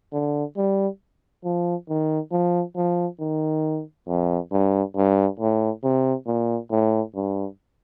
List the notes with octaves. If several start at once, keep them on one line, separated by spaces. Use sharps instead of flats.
D3
G3
F3
D#3
F3
F3
D#3
F2
G2
G2
A2
C3
A#2
A2
G2